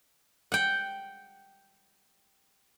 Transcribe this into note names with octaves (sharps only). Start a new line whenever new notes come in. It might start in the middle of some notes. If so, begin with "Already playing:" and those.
F#5 G5